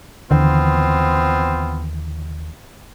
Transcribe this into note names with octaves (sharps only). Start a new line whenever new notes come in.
D#2 D3 E3 B3 C4 F4